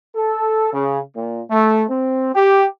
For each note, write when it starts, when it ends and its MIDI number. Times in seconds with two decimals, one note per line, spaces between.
0.16 0.69 69
0.73 1.00 49
1.15 1.41 46
1.51 1.84 57
1.89 2.34 60
2.34 2.65 67